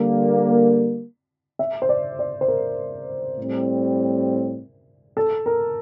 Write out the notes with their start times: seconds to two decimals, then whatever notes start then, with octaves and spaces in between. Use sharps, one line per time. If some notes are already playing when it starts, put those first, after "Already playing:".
Already playing: D3 G3 A#3
1.59 E5
1.82 C5
1.89 D5
2.19 D5
2.41 C5
2.48 A#4
3.38 A2 G3 C4
5.17 A4
5.46 A#4